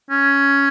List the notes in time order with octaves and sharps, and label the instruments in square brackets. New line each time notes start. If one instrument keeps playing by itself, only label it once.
[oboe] C#4